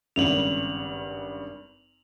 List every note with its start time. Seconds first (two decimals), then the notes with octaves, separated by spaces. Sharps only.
0.16 G#1 G2 C#3 F7 F#7